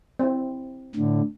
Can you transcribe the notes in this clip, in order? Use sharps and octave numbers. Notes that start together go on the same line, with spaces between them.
C4 E4
A2 D3